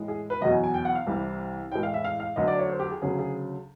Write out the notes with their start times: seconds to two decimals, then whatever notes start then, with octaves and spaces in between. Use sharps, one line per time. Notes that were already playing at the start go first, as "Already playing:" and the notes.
Already playing: A2 E3 G#3
0.08 G#4
0.30 B4
0.41 E2 B2 F#3 D#5
0.52 G#5
0.64 G#5
0.74 G5
0.85 F#5
0.95 F5
1.06 C2 C3 E3 G3
1.72 A2 E3 G#3 G5
1.83 F5
1.94 E5
2.04 F5
2.20 F5
2.36 D2 D3 F#3 D#5
2.48 D5
2.59 C#5
2.70 C5
2.79 G4
2.91 G#4
3.02 D2 C#3 F#3 G#4
3.19 G#4